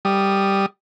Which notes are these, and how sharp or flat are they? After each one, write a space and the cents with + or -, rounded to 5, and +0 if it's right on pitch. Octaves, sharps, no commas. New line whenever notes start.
G3 +0 D#6 -5